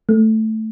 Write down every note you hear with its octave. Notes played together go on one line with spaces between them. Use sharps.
A3